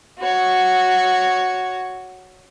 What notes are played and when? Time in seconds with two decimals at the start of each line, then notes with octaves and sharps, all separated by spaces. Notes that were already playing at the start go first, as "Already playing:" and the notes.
0.19 F#4 C#5